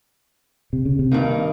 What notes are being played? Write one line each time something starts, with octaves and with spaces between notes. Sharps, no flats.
C3
C#3
C3
G2 D#3 A#3 D#4